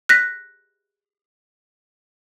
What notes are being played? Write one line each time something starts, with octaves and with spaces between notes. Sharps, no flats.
F#6 A#6 B6